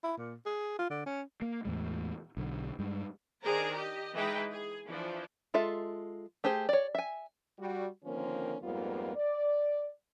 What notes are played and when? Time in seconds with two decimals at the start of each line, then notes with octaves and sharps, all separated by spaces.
0.03 E4
0.17 A#2
0.46 G#4
0.79 F4
0.90 D3
1.06 C#4
1.42 A#3
1.65 E2 A2 G#3
2.37 B1 D3
2.79 G2 G#3
3.43 D#3 D4 G#4 A#4 C5 A#5
3.73 G4 D#5
4.14 E3 G#3 D#4 B4 G5
4.52 G#4
4.86 E3 F3 D4
5.54 G#3 F4 A4 E5
6.44 A3 G4 G#4 C5
6.69 C#5 D5
6.95 E5 G#5
7.59 G3 F#4
8.04 D3 D#3 F3 A#3 C4 C#4
8.62 F2 G#2 G3 A#3 B3 F4
9.16 D5